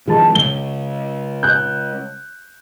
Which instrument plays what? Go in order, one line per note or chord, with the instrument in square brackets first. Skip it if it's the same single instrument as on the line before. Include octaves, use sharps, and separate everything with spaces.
[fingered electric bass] D#3 F3 [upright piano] G#3 A5
[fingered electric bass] C#3 G#3 [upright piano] G7
[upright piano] F#6 G6